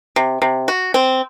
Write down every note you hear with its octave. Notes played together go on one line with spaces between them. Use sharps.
C3
C3
F#4
C4